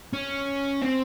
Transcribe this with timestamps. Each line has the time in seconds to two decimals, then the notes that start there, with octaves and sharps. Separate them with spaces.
0.13 C#4
0.82 C4